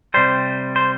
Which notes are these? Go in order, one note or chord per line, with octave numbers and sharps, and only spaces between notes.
C3 G3 C5
C5